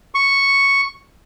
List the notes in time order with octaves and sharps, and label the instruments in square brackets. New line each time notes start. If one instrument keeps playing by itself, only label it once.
[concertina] C#6